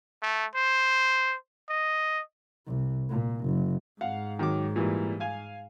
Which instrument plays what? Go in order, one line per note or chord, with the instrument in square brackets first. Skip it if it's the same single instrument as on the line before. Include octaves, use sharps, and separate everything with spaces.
[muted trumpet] A3
C5
D#5
[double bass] C2
A#2
F#1
[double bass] G#2 [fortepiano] F5 F#5
[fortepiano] D#3 F#3 D6
A#2 E3 G3
F5 G#5